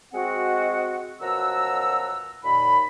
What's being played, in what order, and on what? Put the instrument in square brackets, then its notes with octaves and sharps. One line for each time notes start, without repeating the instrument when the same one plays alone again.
[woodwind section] G#3 C4 F#4 F#5
F#2 B2 F3 F#5 A#5 E6
D#2 A#2 B5